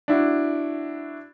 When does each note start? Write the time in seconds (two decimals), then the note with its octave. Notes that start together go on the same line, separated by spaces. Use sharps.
0.08 D4 E4 F#4